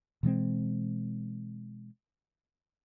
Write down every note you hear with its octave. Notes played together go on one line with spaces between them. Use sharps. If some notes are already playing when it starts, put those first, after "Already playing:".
B2 E3 G#3 C4